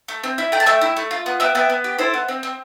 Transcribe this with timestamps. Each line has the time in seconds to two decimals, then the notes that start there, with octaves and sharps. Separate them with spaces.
0.08 A3
0.24 C4
0.38 E4
0.52 A3 G5
0.60 A5
0.66 A3 E5 G5
0.81 E4
0.97 A3
1.11 F4
1.26 B3
1.40 B3 E5 G5
1.55 B3 E5 G5
1.70 B3
1.84 G4
1.98 E4 A4 C5
2.14 B3
2.28 C4
2.43 C4